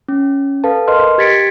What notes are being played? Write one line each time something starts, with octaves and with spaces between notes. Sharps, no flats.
C#4
A4 B4 F5 A5
A#4 B4 D#5 C6 F6
G4 G#6 A6 B6 C#7 D7